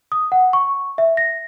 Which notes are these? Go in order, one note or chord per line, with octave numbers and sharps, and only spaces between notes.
D#6
F#5
C#6
E5
A#6